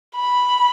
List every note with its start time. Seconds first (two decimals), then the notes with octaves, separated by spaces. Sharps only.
0.16 B5